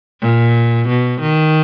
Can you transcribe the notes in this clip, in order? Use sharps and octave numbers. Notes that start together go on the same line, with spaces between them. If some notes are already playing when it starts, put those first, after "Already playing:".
A#2
B2
D#3